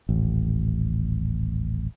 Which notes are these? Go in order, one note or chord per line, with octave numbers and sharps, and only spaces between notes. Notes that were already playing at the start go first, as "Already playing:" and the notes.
D#1 A1